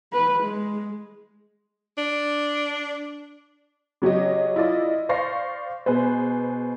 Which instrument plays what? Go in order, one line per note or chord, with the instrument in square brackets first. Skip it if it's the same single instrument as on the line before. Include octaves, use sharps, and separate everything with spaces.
[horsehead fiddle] B4
G#3
[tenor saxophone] D4
[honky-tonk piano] C#3 F#3 G4 C#5 D#5
E4 F4 D5 D#5
C5 D5 F5 C#6 A#6 C7
B2 G#4 B4 C5